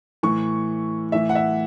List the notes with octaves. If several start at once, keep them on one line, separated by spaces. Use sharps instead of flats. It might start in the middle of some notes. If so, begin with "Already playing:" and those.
A2 E3 C#6
A2 E3 E5
F#5
E5